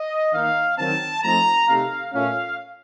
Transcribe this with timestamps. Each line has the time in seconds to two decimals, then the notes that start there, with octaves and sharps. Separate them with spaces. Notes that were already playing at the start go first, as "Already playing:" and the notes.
Already playing: D#5
0.33 D#3 A#3 D#4 F5
0.78 D#3 F#3 C4 A5
1.23 F3 A3 C4 D#4 A#5
1.67 C3 D#3 A3 F5
2.13 A#2 A3 C#4 F5